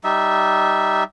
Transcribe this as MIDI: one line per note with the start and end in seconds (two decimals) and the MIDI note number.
0.04 1.03 55
0.04 1.03 63
0.04 1.03 76